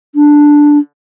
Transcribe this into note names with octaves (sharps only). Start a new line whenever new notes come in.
D4